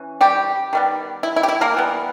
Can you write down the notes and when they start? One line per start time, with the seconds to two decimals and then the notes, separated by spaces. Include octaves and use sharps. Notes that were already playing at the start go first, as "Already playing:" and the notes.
Already playing: E3 C#4
0.21 G3 G4
0.73 D#3 G3 B3
1.23 E4
1.36 E4
1.43 G4
1.48 E4
1.61 A#3 A#4
1.74 E3 G3 B3